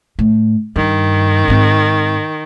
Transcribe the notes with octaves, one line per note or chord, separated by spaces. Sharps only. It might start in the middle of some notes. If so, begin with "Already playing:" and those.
A2
G2 D#3
G#2 C4